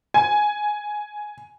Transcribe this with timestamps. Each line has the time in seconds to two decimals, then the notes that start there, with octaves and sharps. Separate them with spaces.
0.14 G#5